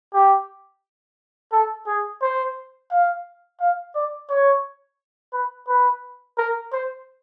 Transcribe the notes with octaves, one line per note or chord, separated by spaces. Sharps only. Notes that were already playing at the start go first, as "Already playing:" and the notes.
G4
A4
G#4
C5
F5
F5
D5
C#5
B4
B4
A#4
C5